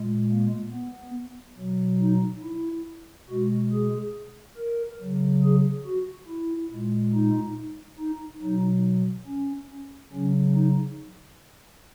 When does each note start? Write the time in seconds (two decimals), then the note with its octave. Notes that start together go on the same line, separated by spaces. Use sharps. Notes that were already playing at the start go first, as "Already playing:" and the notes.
Already playing: A#2 G#3
0.30 A#3
0.72 B3
1.57 B2 F#3
2.01 D#4
2.43 E4
3.29 B2 G#3 F#4
3.72 G#4
4.57 A#4
5.00 C#3 F#3
5.43 G#4
5.85 F#4
6.28 E4
6.71 A#2 G#3
7.14 D#4
7.99 D#4
8.42 B2 F#3 D#4
9.27 C#4
10.13 C#3 F#3 C#4
10.55 D#4